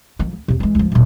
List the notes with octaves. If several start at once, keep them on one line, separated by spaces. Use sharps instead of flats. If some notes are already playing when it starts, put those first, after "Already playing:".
D#3 F3
D2
E2 C3
E3 G#3
C#2 F3
D#1 B2